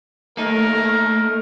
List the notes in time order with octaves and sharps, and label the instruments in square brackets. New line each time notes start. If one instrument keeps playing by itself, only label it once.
[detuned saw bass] A3 [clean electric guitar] A#3 D#4 [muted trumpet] A#4